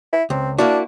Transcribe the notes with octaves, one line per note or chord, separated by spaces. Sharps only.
E4
C#2 C4
A#3 D4 E4 F#4